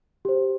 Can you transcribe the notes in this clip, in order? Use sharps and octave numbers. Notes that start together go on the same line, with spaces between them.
G4 C5